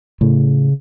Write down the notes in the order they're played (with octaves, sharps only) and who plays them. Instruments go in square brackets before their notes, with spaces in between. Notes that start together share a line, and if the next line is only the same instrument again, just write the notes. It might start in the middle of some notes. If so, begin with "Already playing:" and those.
[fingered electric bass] A2 [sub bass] C#3